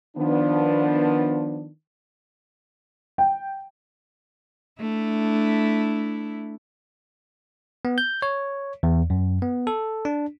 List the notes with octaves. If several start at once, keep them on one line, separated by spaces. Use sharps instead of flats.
D#3 F3 B3 D4
G5
A3 D4 E4
B3
G6
C#5
E2
F#2
B3
A4
D4